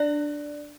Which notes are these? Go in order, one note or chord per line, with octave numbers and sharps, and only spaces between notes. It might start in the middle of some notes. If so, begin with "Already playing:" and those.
Already playing: D4 D5